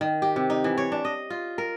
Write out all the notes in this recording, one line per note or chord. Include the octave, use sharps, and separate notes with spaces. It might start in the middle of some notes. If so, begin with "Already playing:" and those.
D#3
G4
C3
D#4
E3
C#5
D4
D#5
F4
A#4